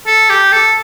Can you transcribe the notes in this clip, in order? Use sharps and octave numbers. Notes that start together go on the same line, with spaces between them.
A4
G4
A4